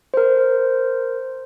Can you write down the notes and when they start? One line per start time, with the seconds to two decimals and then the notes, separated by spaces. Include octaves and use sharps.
0.14 A#4 C5